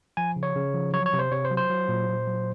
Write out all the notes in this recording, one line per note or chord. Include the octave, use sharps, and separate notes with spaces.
F3 G#5
C#3
C#5
C#3
F3
F#3 C#5
C#5
C3
C5
C3 C#5
C5
F#3
C5
F#3
A#2
A#2
F#3